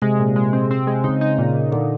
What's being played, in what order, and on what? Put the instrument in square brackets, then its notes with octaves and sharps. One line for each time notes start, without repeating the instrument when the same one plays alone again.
[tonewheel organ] C3 [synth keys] G#3
[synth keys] A#2
G#3
C4
C4
G#3
[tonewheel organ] C#3 [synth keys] D#4
[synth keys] D#4
A#2
A#2
[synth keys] A#2 [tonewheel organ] D3